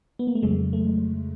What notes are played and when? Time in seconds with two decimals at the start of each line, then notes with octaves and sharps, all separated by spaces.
0.19 B3
0.27 A#3
0.35 A3
0.42 F2 C#3 F#3 G#3
0.73 A3